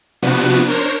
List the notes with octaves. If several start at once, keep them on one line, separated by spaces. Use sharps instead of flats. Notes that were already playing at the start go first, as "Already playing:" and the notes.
C3 F3 B3 D4 F#4 B4
D4 A#4 C5 C#5